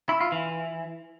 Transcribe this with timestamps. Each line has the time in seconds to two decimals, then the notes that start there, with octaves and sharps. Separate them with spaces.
0.09 E4
0.21 F4
0.32 E3